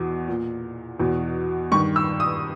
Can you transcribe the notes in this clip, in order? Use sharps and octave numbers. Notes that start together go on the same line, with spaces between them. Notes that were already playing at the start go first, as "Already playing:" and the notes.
Already playing: E2 B2
A#2
E2 B2
G2 D#3 C#6
E6
D#6